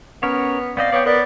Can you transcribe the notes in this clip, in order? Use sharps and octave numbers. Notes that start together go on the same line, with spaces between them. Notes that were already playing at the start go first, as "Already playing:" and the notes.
B3 C#4 A#4 C#5
B3 C4 D5 D#5 F5
B3 C#5 D5 G5
B3 A#4 D5 B5